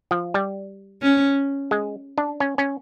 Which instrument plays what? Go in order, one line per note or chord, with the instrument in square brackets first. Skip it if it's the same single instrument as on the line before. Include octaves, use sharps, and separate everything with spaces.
[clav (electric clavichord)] F3
G3
[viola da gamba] C#4
[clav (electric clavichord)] G#3
D4
C#4
C#4